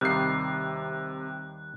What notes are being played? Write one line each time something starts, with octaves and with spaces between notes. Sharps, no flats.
D#2 C3 D#3 G3 F#6 C7